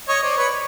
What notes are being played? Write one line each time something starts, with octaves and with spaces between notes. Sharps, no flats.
C#5 D#5
C5 D5
B4 C#5